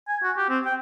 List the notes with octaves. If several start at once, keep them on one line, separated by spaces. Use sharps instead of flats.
G#5
F#4
G4
C4
G5